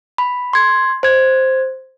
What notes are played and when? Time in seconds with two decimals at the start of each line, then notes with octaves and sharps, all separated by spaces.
0.18 B5
0.53 C6 G#6
1.03 C5 G#6